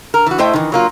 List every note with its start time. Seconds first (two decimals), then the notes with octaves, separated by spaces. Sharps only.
0.14 A#4
0.27 E3 F#4
0.38 A2 A3 E4 C5 D#5 G5
0.53 D#3 E3
0.72 F#3 A#3 F4